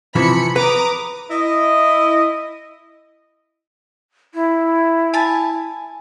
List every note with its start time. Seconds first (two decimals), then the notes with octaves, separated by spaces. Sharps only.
0.16 C3 E3 F3 B5 C#7
0.56 B4 A#5 D6 D#6
1.30 E4 D#5
4.34 E4
5.14 G#5 A5